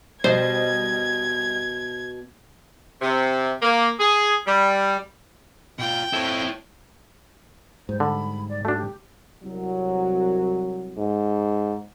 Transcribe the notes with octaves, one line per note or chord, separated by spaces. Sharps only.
B2 G3 C5 D#5 G#6
C3
A#3
G#4
G3
B2 F4 G5
C4 E4 A4 C#5
G#2 G3 C5
D3 B5
D5
A3 D4 F#4
G4
C2 F#3
G#2